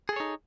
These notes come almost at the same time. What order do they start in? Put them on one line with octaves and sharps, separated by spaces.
G#4 A4 C#5 D#4